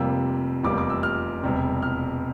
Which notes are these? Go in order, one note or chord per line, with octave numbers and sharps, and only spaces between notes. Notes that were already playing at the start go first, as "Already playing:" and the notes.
Already playing: F1 F2 C3 G3 A#3 E6
F1 E2 C3 G3 A#3 D6
D6
E6
F6
E1 E2 C3 G3
F6